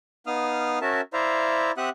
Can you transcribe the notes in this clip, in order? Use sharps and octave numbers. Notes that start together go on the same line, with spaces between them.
B3 D#4 F5 D#6 F6
C#4 F#4 A#4 E5 A5
E4 C5 D5 E5 F5 A#5
C4 G4 E5 F#5 D#6 F#6